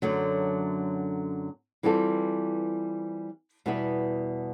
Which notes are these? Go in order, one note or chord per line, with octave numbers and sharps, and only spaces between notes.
F#2 D3 F#3 A3
E3 G3 C4 F4 A4
E2 B2 G3 B3 E4